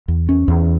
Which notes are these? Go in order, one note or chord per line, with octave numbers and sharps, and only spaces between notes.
E2
C#4
E2